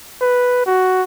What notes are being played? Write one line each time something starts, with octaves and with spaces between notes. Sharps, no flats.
B4
F#4